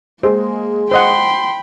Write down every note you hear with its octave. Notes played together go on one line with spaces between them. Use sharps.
G#3 A#3 C5
C5 D#5 F#5 G5 B5 C6